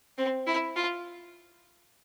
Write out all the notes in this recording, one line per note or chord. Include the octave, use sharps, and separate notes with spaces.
C4
E4
F4